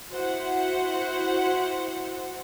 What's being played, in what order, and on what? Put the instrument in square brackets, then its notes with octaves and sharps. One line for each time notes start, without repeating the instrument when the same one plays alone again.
[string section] E4 F#4 C5 F#5